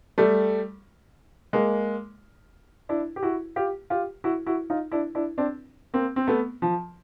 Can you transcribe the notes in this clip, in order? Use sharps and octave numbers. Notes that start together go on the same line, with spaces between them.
G3 A3
G#3 A#3
D4 E4
G4
E4 F#4
F4 G4
F4 G4
E4 F#4
E4 F#4
D#4 F4
D4 E4
D4 E4
C4 D4
A#3 C4
C4
A3 B3
F3